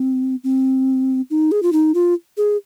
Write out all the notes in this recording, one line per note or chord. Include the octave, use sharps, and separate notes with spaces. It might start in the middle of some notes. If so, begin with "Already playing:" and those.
Already playing: C4
C4
D#4
G#4
F4
D#4
F4
G#4